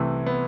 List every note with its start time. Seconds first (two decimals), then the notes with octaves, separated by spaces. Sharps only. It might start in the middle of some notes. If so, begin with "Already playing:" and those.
Already playing: C2 C3 E3 A3
0.26 B3